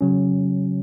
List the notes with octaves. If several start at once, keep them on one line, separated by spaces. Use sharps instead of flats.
C#3 F#3 C#4